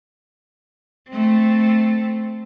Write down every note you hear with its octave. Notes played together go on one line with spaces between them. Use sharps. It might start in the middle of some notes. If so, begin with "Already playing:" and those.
A3 C4